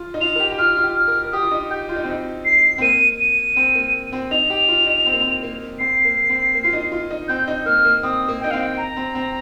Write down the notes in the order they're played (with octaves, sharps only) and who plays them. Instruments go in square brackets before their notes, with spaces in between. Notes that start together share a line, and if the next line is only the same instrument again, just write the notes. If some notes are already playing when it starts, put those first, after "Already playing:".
Already playing: [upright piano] F4
D#4
[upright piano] F4 [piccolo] F7
[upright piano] A#4
G4
G4
[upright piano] F4 [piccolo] F6
[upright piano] F4
G4
[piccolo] F6
[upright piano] A#4
A#4
[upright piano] G4 [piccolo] D#6
[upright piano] F4
D#4
[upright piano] G4 [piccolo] G6
[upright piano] F4
D#4
C4
D#4
[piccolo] C7
[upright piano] C4
[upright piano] A#3 [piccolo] D#7
[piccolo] D#7
[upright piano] C4
A#3
C4
[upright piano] D#4 [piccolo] F7
[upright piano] G4
F4
D#4
C4
A#3
C4
A#3
[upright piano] C4 [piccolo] C7
[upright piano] A#3
C4
A#3
F4
D#4
F4
D#4
[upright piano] C4 [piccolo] G6
[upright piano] D#4
[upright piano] A#3 [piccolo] F6
[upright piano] A#3
[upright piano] C4 [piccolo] D#6
[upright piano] A#3
[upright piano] D#4 [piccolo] G5
[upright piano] C4 [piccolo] F5
[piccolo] G5
A#5
[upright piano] C4
C4